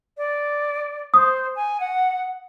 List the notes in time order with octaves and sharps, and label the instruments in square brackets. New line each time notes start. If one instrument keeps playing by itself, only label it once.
[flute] D5
[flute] C5 [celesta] D#6
[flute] G#5
F#5